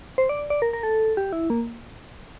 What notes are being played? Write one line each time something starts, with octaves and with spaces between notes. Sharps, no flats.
C5
D5
D5
A#4
A#4
A4
G4
E4
A#3